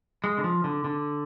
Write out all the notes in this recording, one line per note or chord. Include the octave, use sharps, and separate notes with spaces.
G#3
D3
F3
D3
D3